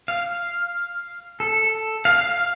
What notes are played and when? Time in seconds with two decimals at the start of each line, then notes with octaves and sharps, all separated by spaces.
0.08 F5
1.40 A4
2.05 F5
2.19 F5